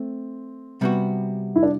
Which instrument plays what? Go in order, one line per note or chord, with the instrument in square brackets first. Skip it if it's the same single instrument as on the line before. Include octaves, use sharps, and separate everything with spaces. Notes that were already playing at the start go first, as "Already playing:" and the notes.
Already playing: [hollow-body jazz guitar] A3 [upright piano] C4
[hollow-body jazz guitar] C3 G3 B3 F#4
[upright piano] E4
D4